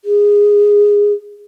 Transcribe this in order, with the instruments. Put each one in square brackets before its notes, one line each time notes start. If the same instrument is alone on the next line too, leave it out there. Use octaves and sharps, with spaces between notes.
[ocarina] G#4